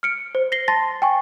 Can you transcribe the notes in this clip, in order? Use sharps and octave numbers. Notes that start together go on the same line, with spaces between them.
F6 C#7 D7
C5
A#6 C7 G7
A5 C6 A6 A#6
G5 G#5 C#6